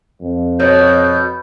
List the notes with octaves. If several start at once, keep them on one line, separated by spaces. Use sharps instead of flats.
F2
B2 C#5 G6